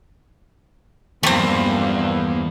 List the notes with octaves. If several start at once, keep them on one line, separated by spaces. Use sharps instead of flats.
E2 G2 F3 A3 A#3 C4